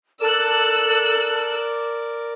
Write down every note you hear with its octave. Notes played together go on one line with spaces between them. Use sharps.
A4 A#4 D5 D6 E6 F#6